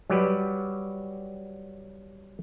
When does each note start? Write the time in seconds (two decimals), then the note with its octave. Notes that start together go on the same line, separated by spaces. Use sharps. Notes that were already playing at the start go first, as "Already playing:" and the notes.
0.10 F#3 G3 G4 B4